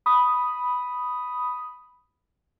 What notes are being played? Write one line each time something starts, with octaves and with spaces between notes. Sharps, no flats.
B5 D#6